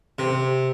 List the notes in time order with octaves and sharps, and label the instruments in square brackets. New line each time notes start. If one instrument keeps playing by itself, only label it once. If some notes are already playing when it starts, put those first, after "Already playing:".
[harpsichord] C3